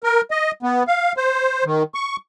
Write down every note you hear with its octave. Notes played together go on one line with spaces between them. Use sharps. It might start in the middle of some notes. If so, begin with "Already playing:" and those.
A#4
D#5
B3
F5
C5
D#3
C#6